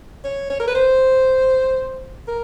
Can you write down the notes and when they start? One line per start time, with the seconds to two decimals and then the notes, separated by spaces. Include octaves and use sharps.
0.24 C#5
0.50 C#5
0.60 A#4
0.68 B4
0.75 C5
2.28 A#4